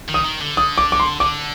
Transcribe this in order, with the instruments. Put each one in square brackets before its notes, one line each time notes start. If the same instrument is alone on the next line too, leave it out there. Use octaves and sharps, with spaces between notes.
[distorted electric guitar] D#3
[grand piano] D#6
[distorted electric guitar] D#3
D3
[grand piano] D#6
D6
D6
C6
[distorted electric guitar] D3 [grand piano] D6